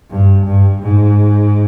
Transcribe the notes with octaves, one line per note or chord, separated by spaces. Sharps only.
G2
G2
G#2